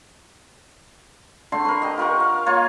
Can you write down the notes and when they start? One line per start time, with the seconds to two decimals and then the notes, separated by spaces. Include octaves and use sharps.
1.52 D3 A3 C6
1.65 A#4 B4
1.82 G4 D#5
1.98 F4 A#4 F#5 C#6
2.20 F5
2.46 A#3 F4 A#4 C#5